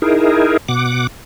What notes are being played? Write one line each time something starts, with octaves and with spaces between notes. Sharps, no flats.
D#4 E4 G#4 A#4
B2 F#5 D6